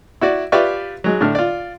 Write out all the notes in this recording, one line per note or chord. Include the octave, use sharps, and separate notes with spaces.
E4 F#4 D5
F4 G4 B4 D5 E5 C#6
F#3 G#3
A2 D3 D4 F6
F4 D5